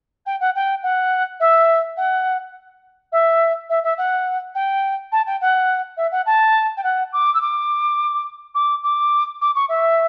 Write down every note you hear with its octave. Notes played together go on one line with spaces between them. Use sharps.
G5
F#5
G5
F#5
E5
F#5
E5
E5
E5
F#5
G5
A5
G5
F#5
E5
F#5
A5
G5
F#5
D6
E6
D6
D6
D6
D6
C#6
E5